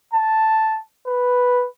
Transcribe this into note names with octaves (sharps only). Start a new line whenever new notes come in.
A5
B4